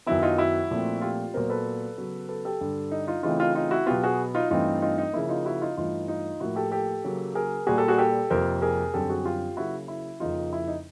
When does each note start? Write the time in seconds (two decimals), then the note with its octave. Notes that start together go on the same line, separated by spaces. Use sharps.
0.06 F#2 D#3 F#3 B3 E4
0.23 D#4 F4
0.38 E4 F#4
0.71 A#2 F3 A3 C4
1.01 F4 G4
1.34 A#2 F#3 B3 A#4 C5
1.49 A4 B4
1.98 C#3 F#3 B3
2.29 A4 B4
2.45 G4 A4
2.61 G2 D3 G3
2.91 D#4
3.07 D#4 F4
3.23 C#3 E3 A3 C4 D#4 F4
3.40 D#4 F4
3.55 D#4 F4
3.71 E4 F#4
3.86 B2 F#3 B3 F4 G4
4.03 F#4 G#4
4.35 D#4 F4
4.50 G2 E3 A3 C4 D#4 F4
4.82 D#4 F4
4.98 D#4
5.13 C#3 F3 A#3 E4
5.29 D#4 F4
5.45 E4 F#4
5.62 D#4 F4
5.77 G2 E3 A3 D#4 F4
6.08 D#4 F4
6.40 A2 F3 A#3 E4 F#4
6.56 G4 A4
6.72 G4 A4
7.04 C#3 F#3 A#3
7.35 G#4 A#4
7.67 A#2 G3 A#3 F#4 G#4
7.78 G4 A4
7.88 F#4 G#4
7.98 G4 A4
8.30 F2 C3 F3 A#3 A#4 C5
8.62 G#4 A#4
8.94 F#2 D3 G3 C4 G4 A4
9.09 F#4 G#4
9.25 F4 G4
9.57 C#3 F#3 A#3 E4 F#4
9.88 E4
10.20 F2 C#3 F3 A#3 D#4 F4
10.53 E4
10.68 D#4